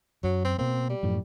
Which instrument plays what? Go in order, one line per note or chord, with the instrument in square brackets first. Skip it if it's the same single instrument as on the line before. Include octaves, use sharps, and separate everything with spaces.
[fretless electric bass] F#2 [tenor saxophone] F#3
[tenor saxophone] C4
[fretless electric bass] B2 A#3 [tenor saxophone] C4
[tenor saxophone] G3
[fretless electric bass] F#2 A2 F3